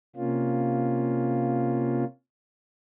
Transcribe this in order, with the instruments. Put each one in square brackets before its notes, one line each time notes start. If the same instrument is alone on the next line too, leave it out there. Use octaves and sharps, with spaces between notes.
[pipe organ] C3 A#3 C#4 F4